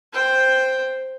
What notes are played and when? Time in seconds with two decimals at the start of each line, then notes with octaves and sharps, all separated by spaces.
0.13 C5 G5